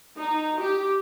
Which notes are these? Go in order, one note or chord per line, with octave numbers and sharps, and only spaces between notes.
D#4
G4